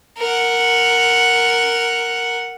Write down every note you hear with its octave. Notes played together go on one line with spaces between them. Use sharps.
A#4 F#5